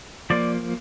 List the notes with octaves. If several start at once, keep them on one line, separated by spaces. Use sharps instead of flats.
F3 A#3 D5